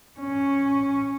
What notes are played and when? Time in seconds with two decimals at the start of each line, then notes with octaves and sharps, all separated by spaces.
0.20 C#4